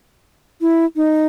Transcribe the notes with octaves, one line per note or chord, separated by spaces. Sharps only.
E4
D#4